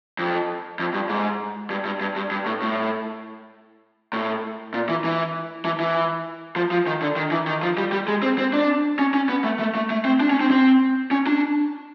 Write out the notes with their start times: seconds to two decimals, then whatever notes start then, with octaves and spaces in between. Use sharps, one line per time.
0.19 F2
0.79 F2
0.94 G2
1.09 G#2
1.70 G2
1.85 G2
2.01 G2
2.16 G2
2.31 G2
2.46 A2
2.62 A2
4.13 A2
4.74 A#2
4.89 E3
5.04 E3
5.65 E3
5.80 E3
6.56 F3
6.71 F3
6.87 D#3
7.02 D3
7.16 D#3
7.31 E3
7.47 D#3
7.62 F3
7.78 G3
7.92 G3
8.08 G#3
8.23 C4
8.38 C4
8.53 D4
8.99 C#4
9.14 C#4
9.29 B3
9.44 A3
9.59 A3
9.75 A3
9.90 A3
10.05 C4
10.20 D4
10.30 C#4
10.41 C4
10.51 C4
11.11 C#4
11.27 D4